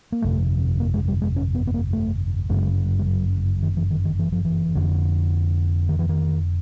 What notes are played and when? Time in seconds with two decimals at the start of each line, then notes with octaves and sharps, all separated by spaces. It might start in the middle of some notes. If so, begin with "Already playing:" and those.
0.12 A#3
0.22 G1 F2 C3 A3
0.80 A#3
0.94 G#3
1.08 G3
1.22 G#3
1.36 C#4
1.55 B3
1.67 B3
1.74 A#3
1.93 A3
2.49 G1 F#2 C#3 G#3
2.99 G3
3.06 F#3
3.63 D#3
3.77 E3
3.91 D#3
4.05 D#3
4.19 E3
4.32 F3
4.45 E3
4.75 F1 F2 D3
5.89 D#3
5.99 E3
6.09 D#3